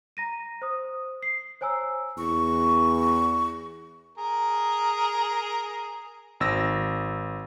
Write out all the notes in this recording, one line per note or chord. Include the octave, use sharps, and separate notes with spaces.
A#5 A#6 D#7
C5 D#6
C7
C5 C#5 G#5 A#5 E6
E2 C#6
G#4 A#4
G#1 E6 A#6